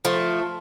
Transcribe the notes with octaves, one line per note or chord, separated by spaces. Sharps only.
F3 A3